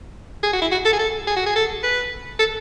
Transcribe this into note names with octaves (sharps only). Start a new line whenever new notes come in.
G#4
F#4
E4
F#4
A4
G#4
A4
G#4
F#4
G#4
A4
B4
A4